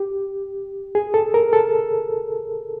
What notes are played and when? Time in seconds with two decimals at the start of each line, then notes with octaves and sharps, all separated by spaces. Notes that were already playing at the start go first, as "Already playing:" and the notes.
Already playing: G4
0.95 G#4
1.14 A4
1.34 A#4
1.53 A4